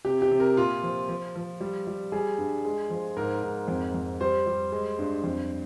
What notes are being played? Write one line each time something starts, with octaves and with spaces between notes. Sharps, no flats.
C3 G4
G4
C3
A#4
A#2 F4
F3
F3
F3
G3
G3
G3 G#4
G2
G#3
F3
G#2 A#4
G#2
F2
F2
G3 C5
G3
G#3
G2
F2